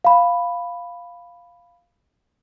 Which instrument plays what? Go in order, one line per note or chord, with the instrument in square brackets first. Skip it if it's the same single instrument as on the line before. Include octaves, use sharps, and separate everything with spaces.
[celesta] F5 B5